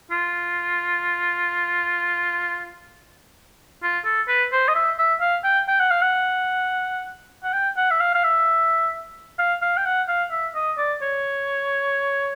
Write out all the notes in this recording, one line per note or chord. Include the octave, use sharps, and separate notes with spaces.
F4
F4
A4
B4
C5
D#5
E5
E5
F5
G5
G5
F#5
F5
F#5
F#5
G5
F#5
E5
F5
F5
E5
F5
F5
G5
F#5
F5
E5
D#5
D5
C#5